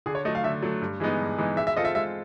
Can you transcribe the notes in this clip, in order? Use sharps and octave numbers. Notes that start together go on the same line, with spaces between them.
D3 G#4
C#5
F#3 A3 D#5
F5
D3 E5
F#3 A3
G2
E3 G#3 B3 D#4
G2
E3 G#3 B3 D#4
G#3 E5
E5
C4 F4 A4 D#5
E5
G#3 E5